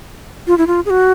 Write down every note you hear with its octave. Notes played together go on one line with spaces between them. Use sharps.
F4
E4
F4
G#4
F#4